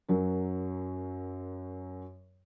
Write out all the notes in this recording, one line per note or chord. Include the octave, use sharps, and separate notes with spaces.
F#2 F#3 A#4